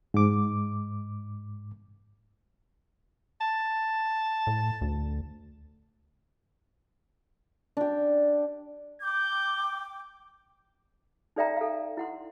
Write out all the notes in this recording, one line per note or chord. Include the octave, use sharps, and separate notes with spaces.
G#2 D6
A5
A2
D2
D4 G4
G5 D6 G6
D#4 A4 D5 E5 G5 A#5
A4 F5
E4 F#5 C6